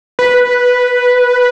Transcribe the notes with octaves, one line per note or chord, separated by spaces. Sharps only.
B4